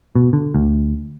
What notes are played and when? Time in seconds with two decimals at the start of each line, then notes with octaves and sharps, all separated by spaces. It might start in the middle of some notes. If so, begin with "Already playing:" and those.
0.15 B2
0.33 D3
0.54 D2